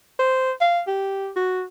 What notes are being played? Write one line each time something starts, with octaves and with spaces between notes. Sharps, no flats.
C5
F5
G4
F#4